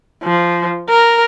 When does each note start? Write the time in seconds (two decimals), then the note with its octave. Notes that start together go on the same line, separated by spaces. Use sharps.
0.24 F3
0.89 A#4